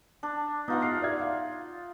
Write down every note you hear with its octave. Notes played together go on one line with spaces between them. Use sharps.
D4
B3 D#4 F4 F#5
F6 C7
D5 E5 G#6
F5